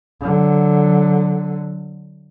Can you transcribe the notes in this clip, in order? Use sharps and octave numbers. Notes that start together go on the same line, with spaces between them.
D3 F#3